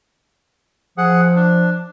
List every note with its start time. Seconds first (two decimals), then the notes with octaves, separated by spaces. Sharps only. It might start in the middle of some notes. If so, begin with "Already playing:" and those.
0.98 F3 G#4 F#5
1.36 D4